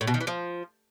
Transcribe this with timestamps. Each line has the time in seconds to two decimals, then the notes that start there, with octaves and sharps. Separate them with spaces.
0.01 A2
0.07 B2
0.14 D#3
0.21 E3
0.27 F3